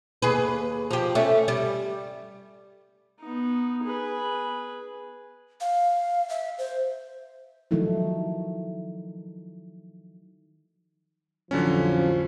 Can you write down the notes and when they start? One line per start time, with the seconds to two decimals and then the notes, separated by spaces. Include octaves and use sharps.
0.22 D#2 G#4 B4
0.91 F3 G4
1.15 A3 C#4
1.48 G3
3.20 B3 D#4
3.83 G#4 B4
5.61 F5
6.29 E5
6.58 C5
7.71 D#3 F3 F#3 A3 D#4 E4
11.51 A1 F2 D3 F3 F#3 C#4